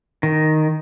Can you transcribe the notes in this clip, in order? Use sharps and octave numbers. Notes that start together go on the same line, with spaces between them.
D#3